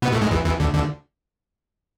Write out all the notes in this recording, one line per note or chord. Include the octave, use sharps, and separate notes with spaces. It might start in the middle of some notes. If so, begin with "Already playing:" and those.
B2 B3
A2 A3
G#2 G#3
E2 E3
E2 E3
D2 D3
D2 D3